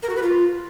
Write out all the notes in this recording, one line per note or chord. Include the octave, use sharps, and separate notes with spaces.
A#4
F#4
B4
F4